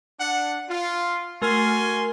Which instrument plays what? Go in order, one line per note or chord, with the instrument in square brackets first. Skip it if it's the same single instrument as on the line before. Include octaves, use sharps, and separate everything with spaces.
[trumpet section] D4 F#5
F4
[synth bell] A3 A#4 F6 [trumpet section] F#4 G#5 C6